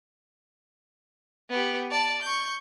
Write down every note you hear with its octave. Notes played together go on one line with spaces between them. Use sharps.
B3 G4
D5 A5
C#6 G6